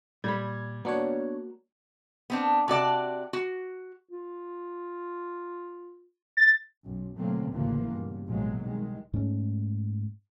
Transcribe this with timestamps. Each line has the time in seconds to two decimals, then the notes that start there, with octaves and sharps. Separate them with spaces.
0.24 A#2 G3 B5 G#6
0.85 A#3 B3 D4 F#4 C#5
2.30 B3 C4 D4
2.68 C3 F#4 D5 A5
3.33 F#4
4.12 F4
6.37 A6
6.84 B1 F#2
7.18 B2 D3 F#3 A3 A#3 C4
7.52 A1 D2 C#3 E3 F3 A#3
7.86 C#2 G2 B2
8.28 A1 B2 F3 F#3 G#3 A#3
8.62 C2 D#3 G#3
9.14 G#2 G#3 A3 C#4